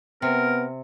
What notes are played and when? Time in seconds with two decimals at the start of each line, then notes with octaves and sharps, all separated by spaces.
0.22 C3 B3 A#4